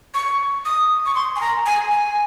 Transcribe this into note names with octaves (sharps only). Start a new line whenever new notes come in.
C#6
D#6
C#6
C6
G#5
A#5
G#5
G#5